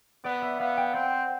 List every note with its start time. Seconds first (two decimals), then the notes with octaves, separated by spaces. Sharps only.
0.24 B3 D5
0.42 E5
0.59 B3 F5
0.77 G5
0.94 C4 F#5